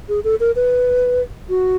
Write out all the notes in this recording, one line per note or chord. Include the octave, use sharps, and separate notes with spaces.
G#4
A4
A#4
B4
F#4